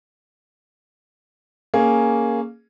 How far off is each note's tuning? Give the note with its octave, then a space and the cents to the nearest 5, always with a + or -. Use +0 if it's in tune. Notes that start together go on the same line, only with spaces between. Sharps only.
A#3 +0 C#4 +0 G#4 +0